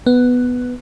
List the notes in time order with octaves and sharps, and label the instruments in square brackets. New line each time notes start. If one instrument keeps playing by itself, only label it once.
[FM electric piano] B3